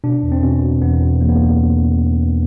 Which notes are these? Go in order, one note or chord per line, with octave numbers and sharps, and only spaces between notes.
B2 D4
E2
C4
B2 C#4
B2
E2 B3
B2
E2 A#3
B3
A#3